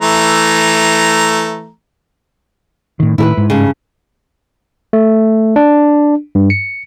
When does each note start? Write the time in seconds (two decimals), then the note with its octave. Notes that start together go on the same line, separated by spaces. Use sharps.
0.02 E3 A3 A#5
3.00 A2 D#3
3.18 A2 D#3 E4 A#4 B4
3.37 G#2
3.50 G2 C#3
4.93 A3
5.56 D4
6.35 G2
6.50 C#7